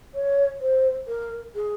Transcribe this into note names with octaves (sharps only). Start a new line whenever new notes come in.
C#5
C5
A#4
G#4